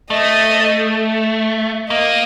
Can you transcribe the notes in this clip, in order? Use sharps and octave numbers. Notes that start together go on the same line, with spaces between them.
A3 D#5
A#3 D#5